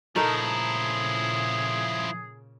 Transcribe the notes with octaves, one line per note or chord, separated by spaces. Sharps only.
A#2 C#3 F3 A3 D#4 E4 G#4 A#4